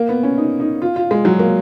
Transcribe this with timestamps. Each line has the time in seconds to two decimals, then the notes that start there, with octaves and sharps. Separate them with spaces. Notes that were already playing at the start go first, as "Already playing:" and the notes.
Already playing: A#3
0.09 B3
0.23 C#4
0.38 D#4
0.60 D#4
0.82 F4
0.96 F4
1.11 G#3
1.25 F#3
1.39 A#3